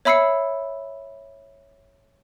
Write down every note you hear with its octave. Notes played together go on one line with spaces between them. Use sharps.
C#5 E5 B5 E6 C7 C#7